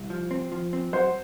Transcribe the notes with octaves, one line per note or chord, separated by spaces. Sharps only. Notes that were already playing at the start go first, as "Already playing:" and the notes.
Already playing: C2
F3
C4
F3
C4
F#3 C5